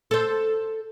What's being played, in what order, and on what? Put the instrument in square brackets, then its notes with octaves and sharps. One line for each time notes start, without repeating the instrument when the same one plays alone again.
[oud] A4 C5